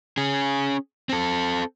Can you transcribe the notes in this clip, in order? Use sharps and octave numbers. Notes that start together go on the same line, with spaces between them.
C#4 G#4
C4 A4